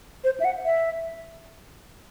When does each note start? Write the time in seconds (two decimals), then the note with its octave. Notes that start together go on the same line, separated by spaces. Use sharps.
0.24 C5
0.40 E5
0.45 F#5
0.65 E5